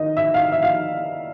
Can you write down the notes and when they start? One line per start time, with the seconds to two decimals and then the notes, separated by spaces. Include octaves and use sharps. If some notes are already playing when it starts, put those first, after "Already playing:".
Already playing: D#3 D#5
0.17 E5
0.34 F5
0.52 E5
0.62 F5